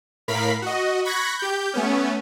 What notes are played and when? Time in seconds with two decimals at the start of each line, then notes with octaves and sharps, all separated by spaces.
0.28 A2 A#4 F5 B5 B6
0.62 F#4 D#5
1.05 B5 C#6 F#6 G#6 A#6
1.39 G4 G6
1.74 A3 B3 C#4